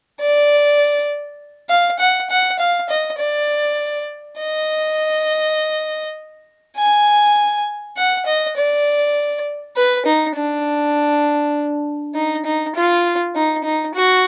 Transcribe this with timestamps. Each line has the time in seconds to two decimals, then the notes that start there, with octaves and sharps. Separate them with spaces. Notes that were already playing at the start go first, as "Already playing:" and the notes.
0.21 D5
1.69 F5
1.99 F#5
2.30 F#5
2.59 F5
2.90 D#5
3.18 D5
4.39 D#5
6.77 G#5
7.97 F#5
8.26 D#5
8.57 D5
9.77 B4
10.06 D#4
10.36 D4
12.15 D#4
12.45 D#4
12.75 F4
13.35 D#4
13.64 D#4
13.95 F#4